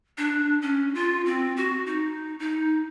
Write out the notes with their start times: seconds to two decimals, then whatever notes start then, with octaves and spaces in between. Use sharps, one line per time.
0.18 D4
0.62 C#4
0.95 F4
1.26 C4
1.57 F#4
1.87 D#4
2.40 D#4